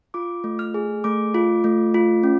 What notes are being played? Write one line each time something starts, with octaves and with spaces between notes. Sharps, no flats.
F4 D6
A3
F6
G#4
A3 D6
F4
A3
F4
C#4